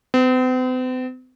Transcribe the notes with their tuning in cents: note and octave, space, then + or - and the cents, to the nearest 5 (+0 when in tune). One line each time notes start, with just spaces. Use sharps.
C4 -45